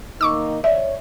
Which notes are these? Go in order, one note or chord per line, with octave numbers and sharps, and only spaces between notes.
D#3 A#3 D#4 C#6 D6 E6
C#5 D5 E5